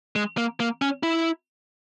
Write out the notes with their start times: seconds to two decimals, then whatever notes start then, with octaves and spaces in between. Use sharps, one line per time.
0.16 G#3
0.38 A#3
0.60 A#3
0.82 C#4
1.03 E4